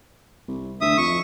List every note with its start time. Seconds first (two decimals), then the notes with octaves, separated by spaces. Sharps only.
0.48 C2
0.81 D2 E5 D#6
0.98 F2 C#6